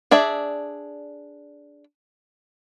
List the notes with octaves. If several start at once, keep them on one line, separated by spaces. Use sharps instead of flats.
D4 G#4 D5 E5